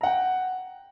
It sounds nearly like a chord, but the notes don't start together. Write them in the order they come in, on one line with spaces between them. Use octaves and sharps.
A#5 F#5 G5